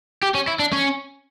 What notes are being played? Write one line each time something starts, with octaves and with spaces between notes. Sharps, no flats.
G4
C#4
E4
D4
C#4